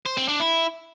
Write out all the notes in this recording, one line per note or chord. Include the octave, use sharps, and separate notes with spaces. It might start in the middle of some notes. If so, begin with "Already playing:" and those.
C5
C4
D4
E4